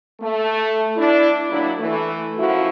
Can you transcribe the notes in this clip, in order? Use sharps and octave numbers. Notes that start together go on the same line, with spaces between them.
A3
D4 E4
D#2 F#3 D4 E4
E3 A3
F#2 F3 E4 F#4